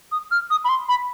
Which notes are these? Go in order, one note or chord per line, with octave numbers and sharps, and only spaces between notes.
D#6
F6
D#6
B5
C6
B5